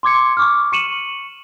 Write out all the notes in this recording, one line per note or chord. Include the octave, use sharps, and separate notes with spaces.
C6 D6 G#6 C#7
C#6 D6 F6
C#6 C#7 D#7 E7 F#7